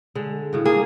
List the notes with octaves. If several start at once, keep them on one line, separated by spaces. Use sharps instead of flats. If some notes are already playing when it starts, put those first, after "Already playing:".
D3 G#3
A2 C#3 F#4
A#3 F4 G#4